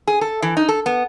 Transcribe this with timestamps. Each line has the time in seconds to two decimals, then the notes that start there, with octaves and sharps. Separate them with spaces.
0.08 G#4
0.21 A4
0.42 E3
0.57 D#4
0.69 A4
0.86 B3